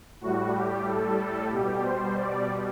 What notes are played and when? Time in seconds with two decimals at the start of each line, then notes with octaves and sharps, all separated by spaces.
0.21 A2 G3 F#4
0.54 G4
0.86 A4
1.52 B2 G3 G4
1.84 C5
2.17 D5